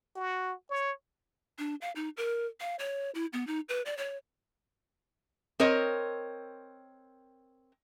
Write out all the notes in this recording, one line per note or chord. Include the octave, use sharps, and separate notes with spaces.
F#4
C#5
D4
F5
D#4
A#4
F5
C#5
E4
B3
D#4
B4
D5
C#5
C4 A#4 C#5 D#5